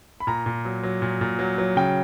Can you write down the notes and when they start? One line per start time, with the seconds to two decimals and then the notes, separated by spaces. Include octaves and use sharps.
0.20 B5
0.27 A#2 A#5
0.46 A#2
0.65 F#3
0.83 F#3
1.02 A#2
1.21 A#2
1.39 F#3
1.58 F#3
1.76 C#3 G5